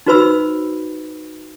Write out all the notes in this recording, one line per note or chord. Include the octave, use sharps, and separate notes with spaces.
D#4 F#4 B4 C5 B5 E6